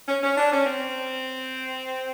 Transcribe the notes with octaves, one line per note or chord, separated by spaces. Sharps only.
C#4
C#4
D4
C#4
C4